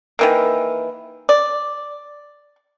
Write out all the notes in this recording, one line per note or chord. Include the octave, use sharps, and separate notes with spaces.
D#3 E3 A#3
D5